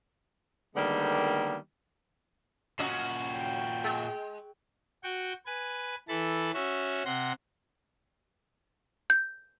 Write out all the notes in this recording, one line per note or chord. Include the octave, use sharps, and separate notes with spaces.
D3 D#3 G3 G#3 A#3 B3
A#2 F#3 C#4 F#4 D#5
G5
G#3
F#4 G5 C#6
B4 G#5
E3 A4 B5 A6
C#4 F#4 E5
C3 F#5 C6 A#6
G6